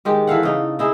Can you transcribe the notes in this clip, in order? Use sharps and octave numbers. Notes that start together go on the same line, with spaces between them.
D#3 G#3 G4
E3 A4 F5 F#5
C#3 D#4
D#4 E4 G#4